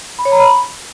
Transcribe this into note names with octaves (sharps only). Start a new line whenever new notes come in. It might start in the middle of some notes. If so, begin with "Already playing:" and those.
B5
C#5
A#5
B5